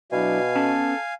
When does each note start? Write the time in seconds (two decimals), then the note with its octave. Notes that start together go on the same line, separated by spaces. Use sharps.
0.12 B2 F#3 D4 E4 F5 G#5
0.55 B3 C#4 A4 A5